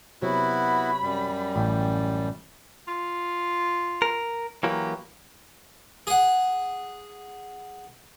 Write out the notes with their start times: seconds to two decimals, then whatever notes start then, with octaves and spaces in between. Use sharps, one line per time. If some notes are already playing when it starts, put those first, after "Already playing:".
0.22 C3 F#3 B3 E4 F#4 B5
1.02 F#2 G3
1.56 A1 G5
2.88 F4
4.02 A#4
4.63 E3 F#3 A#3 G4
6.07 G#4 F#5